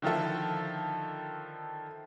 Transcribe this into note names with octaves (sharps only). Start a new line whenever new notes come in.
D3 D#3 F3 E4 A4